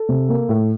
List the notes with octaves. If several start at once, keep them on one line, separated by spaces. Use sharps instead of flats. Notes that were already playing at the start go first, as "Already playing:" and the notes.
Already playing: A4
C3
A#3
A2